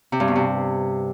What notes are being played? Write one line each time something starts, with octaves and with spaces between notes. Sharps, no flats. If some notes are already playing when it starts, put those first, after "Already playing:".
C3
G2
B2
C3